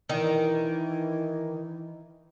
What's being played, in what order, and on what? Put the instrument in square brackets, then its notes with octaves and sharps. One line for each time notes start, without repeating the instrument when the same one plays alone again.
[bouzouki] D#3 [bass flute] E3